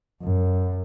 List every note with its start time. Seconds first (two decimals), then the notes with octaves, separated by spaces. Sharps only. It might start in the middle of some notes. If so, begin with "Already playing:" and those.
0.23 F#2